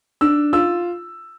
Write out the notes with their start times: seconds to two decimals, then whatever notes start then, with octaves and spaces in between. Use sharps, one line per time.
0.21 D4 E6
0.53 F4 E6